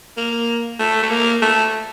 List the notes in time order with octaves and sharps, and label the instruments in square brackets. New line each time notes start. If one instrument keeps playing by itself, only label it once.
[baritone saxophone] A#3
A3
A3
A#3
A3